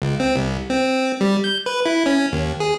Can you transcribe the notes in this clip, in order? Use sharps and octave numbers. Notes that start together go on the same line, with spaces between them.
C#2
C4
C2
C4
G3
G6
B4
E4
C#4
D#2
G#4